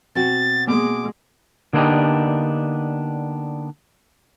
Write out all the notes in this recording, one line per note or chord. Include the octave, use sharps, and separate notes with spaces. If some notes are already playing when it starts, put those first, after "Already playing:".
B2 C4 F#4 A6
G#3 A#3 B3 D6
D3 A#3 B3 D4 D#4 G4